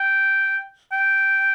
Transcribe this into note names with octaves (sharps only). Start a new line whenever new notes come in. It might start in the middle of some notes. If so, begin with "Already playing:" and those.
Already playing: G5
G5